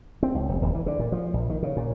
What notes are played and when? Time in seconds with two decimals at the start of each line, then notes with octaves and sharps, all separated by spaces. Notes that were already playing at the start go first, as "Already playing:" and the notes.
0.23 C4
0.35 C#2
0.49 F1
0.62 D#1
0.75 E3
0.86 D3
0.99 A#2
1.12 F3
1.34 A#1
1.50 D#3
1.63 C#3
1.77 A#2